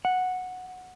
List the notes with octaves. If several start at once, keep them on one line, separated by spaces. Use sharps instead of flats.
F#5